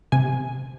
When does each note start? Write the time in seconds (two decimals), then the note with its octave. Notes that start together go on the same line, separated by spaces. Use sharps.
0.12 C3 G#5